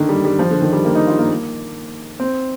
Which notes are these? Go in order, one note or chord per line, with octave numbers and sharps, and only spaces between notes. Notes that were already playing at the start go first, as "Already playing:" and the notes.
Already playing: D3 D#3 A#3
G3
G3
F3
D3
D#3
G3
A#3
D#4
F4
A#3
A#3
C4